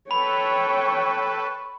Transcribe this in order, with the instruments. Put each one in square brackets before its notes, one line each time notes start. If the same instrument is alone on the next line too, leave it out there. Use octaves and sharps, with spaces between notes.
[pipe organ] A4 B4 [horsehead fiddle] C#5 G5 [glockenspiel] B5 [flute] C#6